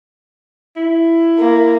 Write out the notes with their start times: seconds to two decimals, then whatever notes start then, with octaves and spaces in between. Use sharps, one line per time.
0.77 E4
1.38 A#3